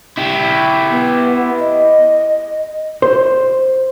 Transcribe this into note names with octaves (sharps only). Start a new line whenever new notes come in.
E4 G4
B3
D#5
C5